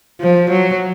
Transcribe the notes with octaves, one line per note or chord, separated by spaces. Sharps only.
F3
F#3